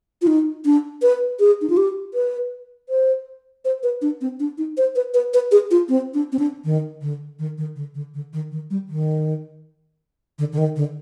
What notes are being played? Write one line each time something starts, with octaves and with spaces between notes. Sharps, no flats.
F4
D#4
D4
B4
G#4
D#4
F4
G4
B4
C5
C5
B4
D4
C4
D4
D#4
C5
B4
B4
B4
G#4
F4
C4
D4
C4
D4
D#3
D3
D#3
D#3
D3
D3
D3
D#3
D#3
G3
D#3
D3
D3
D#3
D3